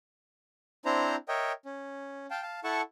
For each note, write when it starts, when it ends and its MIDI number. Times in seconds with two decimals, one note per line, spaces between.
0.85 1.16 60
0.85 1.16 62
0.85 1.16 64
0.85 1.16 72
0.85 1.16 82
1.28 1.52 70
1.28 1.52 73
1.28 1.52 75
1.28 1.52 76
1.28 1.52 79
1.65 2.26 61
2.31 2.42 77
2.31 2.42 79
2.31 2.42 81
2.42 2.60 77
2.42 2.60 81
2.64 2.81 64
2.64 2.81 69
2.64 2.81 78
2.64 2.81 81
2.64 2.81 85